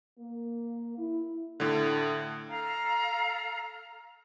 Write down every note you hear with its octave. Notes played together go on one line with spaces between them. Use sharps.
A#3
E4
A2 D3
A4 F5 A#5 F6